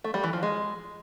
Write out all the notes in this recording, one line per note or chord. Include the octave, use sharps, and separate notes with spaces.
A3
G3
E3
F3
G#3